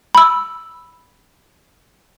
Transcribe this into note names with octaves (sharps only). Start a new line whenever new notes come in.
B5 E6